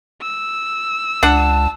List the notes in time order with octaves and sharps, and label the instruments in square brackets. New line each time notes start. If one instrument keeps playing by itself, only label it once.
[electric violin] E6
[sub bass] C#2 [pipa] D4 F#5 [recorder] A5